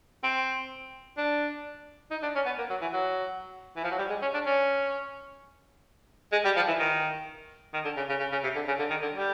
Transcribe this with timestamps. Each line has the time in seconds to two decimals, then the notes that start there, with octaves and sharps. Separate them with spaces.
0.23 C4
1.17 D4
2.11 D#4
2.23 D4
2.35 C#4
2.45 B3
2.58 A#3
2.70 F#3
2.81 E3
2.93 F#3
3.77 E3
3.84 F3
3.91 F#3
3.98 G3
4.10 G#3
4.22 C#4
4.34 D4
4.46 C#4
6.32 G#3
6.44 G3
6.56 F3
6.67 E3
6.79 D#3
7.73 D#3
7.85 D3
7.97 C#3
8.09 C#3
8.20 C#3
8.32 C#3
8.44 C3
8.55 D3
8.68 C#3
8.79 D3
8.90 D#3
9.02 D3
9.15 G3